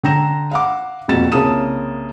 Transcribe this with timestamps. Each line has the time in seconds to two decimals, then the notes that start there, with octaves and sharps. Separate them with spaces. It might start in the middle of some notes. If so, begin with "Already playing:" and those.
0.04 D3 G5 A#5 A#6 E7
0.51 F5 F#5 D6
1.08 E1 F2 A#2 F#4 A6 E7
1.32 C2 C#3 A#3 A5 D#6 E7